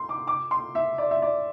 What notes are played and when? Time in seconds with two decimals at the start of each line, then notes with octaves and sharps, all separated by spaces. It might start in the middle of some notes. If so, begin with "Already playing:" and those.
Already playing: C6
0.09 D6
0.27 D6
0.51 C6
0.75 E5
0.98 D5
1.11 E5
1.22 D5